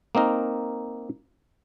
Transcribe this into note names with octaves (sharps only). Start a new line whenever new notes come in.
A#3 C4 D#4 A#4